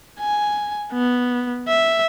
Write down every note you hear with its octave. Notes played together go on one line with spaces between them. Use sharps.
G#5
B3
E5